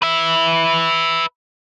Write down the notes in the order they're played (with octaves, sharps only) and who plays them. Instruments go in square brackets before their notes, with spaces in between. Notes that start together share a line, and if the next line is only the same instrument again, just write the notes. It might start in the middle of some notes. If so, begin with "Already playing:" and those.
[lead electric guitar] B4 E5